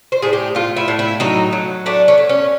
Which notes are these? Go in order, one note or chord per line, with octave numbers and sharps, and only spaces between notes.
C5
A2 G#4
G4
A2 F4
E4
A2
E4
F#3 D#4
F#3
A3 D4
C#4
A3
C#4